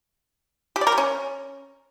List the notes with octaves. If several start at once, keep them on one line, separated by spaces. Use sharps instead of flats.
G4
D5
A#4
G4
C#4